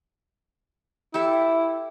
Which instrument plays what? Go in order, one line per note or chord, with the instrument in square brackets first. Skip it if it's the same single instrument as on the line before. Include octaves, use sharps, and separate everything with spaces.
[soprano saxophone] E4 [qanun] G4 A4 E5